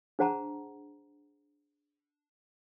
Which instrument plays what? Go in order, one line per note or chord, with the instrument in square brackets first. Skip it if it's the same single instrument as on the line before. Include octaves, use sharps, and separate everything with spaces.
[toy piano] D4 G#4 C5 F#5 A5 A#5